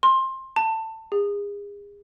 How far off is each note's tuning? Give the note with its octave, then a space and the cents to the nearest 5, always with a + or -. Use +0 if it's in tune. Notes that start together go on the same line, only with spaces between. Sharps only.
C6 +20
A5 +20
G#4 -35